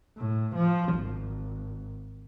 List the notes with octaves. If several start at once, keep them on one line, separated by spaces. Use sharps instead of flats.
A2
F3
G#1